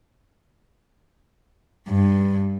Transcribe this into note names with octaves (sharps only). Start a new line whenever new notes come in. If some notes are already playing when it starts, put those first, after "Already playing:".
G2